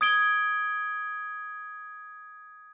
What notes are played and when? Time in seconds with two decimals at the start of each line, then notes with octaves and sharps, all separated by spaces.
0.01 D#6 G#6 D7 G7